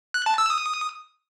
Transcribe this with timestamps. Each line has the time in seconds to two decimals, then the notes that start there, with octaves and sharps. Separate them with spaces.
0.14 F#6
0.26 A5
0.38 E6
0.50 D#6